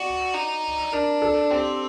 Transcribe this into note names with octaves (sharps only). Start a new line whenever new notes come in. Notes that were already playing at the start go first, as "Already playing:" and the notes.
Already playing: F#4 D5
D#4
D4 A#4
A4
C4 G4